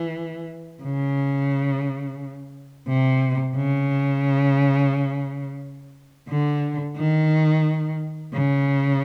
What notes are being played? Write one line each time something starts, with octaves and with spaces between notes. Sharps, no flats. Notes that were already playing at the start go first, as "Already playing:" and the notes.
Already playing: E3
C#3
C3
C#3
D3
D#3
C#3